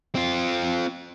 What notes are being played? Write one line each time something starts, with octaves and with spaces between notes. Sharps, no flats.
C4 F4